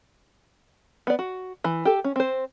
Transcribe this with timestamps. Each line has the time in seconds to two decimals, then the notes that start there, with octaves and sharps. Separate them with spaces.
1.07 B3 D5
1.19 F#4
1.64 E3
1.85 G4 A4
2.04 C#4
2.16 C4 C5